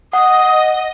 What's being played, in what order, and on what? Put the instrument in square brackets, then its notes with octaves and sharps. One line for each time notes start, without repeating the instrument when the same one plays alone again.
[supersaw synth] D#5 [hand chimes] F#5 [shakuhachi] D#6